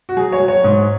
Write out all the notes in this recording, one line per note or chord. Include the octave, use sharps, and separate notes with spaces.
F#4
F#3 G#4
C#5
F#3
C#5
G#2